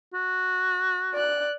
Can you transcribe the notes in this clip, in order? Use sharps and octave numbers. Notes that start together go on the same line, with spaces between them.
F#4
D5 F#6